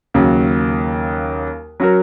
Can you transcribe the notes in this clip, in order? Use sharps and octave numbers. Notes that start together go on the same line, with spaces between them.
D#2 C#3 F#3
F#3 C#4 F#4 A#4